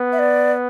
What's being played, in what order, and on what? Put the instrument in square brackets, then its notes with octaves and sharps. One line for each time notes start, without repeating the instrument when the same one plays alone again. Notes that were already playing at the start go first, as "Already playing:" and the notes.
Already playing: [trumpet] B3
[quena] E5
D5